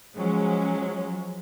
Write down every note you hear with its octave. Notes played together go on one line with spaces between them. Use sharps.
F3 F#3 G#3 C#4